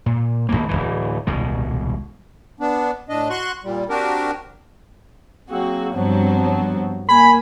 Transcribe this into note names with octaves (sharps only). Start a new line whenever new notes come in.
A#2
G#1 F2 G#2 A#3
D1 G1 E3
D#1 C2 B2 G#3
B3 D4
A2 D4 D#5
F#4 C6 C#6 F#6
A#2 G3
C4 D4 F#4 G4 A#4
F#3 A#3 C4 F#4 G#4
G2 F3 F#3 B3 C4
A#3 G#5 B5